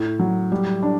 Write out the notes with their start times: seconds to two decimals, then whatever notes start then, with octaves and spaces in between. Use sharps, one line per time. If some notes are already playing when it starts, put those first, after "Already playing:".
Already playing: A2
0.19 F#3
0.52 G3
0.83 D4